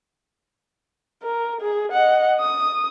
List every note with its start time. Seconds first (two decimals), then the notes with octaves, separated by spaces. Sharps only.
1.23 A#4
1.60 G#4
1.92 D#5 F#5
2.40 D#6